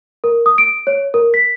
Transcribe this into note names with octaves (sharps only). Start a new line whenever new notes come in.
A#4
D#6
D7
C#5
A#4
B6